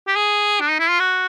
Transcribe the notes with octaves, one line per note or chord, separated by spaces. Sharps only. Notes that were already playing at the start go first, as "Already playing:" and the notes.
G4
G#4
D4
D#4
E4
F4
F#4